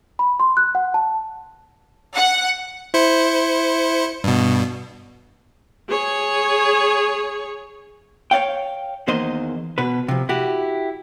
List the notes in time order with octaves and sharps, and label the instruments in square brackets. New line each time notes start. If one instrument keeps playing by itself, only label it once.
[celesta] B5
C6
F#6
F#5
A5
[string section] F#5
[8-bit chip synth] E4 C5 C#7
G2 B2
[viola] G#4 C#5
[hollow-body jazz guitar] C#5 D5 F5 G5
E2 D#3 A#3 C5 D#5 C6
B2 B4
C3 F3
E4 F#4 G4